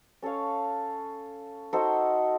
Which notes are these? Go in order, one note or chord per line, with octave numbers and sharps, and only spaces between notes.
C#4 A4 C#5 F5
D#4 F#4 A4 C5